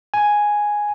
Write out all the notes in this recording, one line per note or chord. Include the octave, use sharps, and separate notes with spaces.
G#5